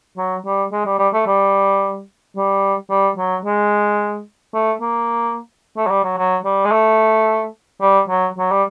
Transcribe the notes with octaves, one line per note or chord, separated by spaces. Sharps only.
F#3
G3
G#3
G3
G3
A3
G3
G3
G3
F#3
G#3
A3
A#3
A3
F#3
G3
F#3
F#3
G3
G#3
A3
G3
F#3
F#3
G3